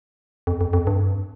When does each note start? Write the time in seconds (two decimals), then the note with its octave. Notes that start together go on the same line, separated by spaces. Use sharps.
0.47 F2
0.61 F2
0.73 F2
0.87 G2